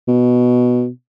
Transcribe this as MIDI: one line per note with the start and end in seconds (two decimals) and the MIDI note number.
0.08 0.88 47